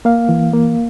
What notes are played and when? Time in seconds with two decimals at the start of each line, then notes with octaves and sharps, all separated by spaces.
0.05 A#3 F5
0.29 E3
0.53 A#3